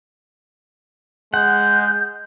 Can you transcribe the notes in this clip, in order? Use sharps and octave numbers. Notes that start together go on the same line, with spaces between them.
G#3 F#5 G6